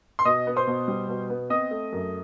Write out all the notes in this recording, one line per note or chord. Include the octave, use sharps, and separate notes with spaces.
C6
B2 D#5 D#6
B3
C5 C6
B2
G3
B2
B3
C4 D#5 D#6
A3
F#2